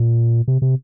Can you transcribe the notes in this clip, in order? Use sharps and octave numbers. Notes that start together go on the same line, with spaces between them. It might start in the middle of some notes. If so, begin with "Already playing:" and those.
Already playing: A#2
C3
C3